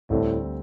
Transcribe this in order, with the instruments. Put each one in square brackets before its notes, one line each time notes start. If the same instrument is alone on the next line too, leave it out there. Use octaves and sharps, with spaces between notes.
[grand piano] D2 D3 G3 C4 [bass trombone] A2